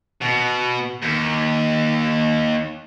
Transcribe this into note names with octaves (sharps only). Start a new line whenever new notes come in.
B2
D#2